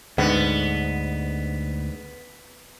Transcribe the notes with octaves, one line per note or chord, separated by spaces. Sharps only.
D2 G#2 D3 B3